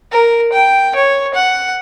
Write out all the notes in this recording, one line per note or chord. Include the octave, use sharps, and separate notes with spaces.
A#4
G5
C#5
F#5